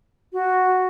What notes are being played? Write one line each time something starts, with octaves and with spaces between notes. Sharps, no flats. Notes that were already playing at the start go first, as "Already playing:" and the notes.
F#4